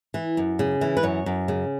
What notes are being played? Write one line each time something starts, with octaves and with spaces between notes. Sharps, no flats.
E3
F#2
C#3
E3
B4
F#2 C#5
F#2
C#3